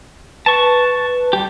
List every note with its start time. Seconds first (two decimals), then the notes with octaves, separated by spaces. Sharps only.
0.46 B4 A5 C#6
1.33 G3 G4